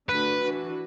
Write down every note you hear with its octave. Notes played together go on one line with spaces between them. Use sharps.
D3 A3 D4 F#4 B4
E3 D4 F#4